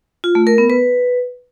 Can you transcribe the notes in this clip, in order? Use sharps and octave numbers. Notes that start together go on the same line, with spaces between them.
F4
A3
A#4
B3
B4